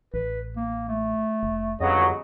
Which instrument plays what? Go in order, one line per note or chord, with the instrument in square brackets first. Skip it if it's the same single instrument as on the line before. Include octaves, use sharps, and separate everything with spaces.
[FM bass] A1 [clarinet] B4
[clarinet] A#3
A3
[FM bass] F1
[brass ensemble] G1 C#3 F#3 [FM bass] F2 [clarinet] D#5